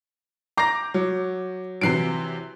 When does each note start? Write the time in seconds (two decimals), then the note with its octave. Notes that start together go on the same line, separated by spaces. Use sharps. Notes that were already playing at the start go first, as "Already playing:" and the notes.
0.58 A#5 D6 G6 A#6 C7
0.94 F#3
1.81 C3 E3 F#3 C7 D7